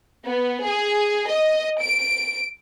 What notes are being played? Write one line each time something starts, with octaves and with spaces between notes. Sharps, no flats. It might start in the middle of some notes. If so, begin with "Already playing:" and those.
B3
G#4
D#5
D7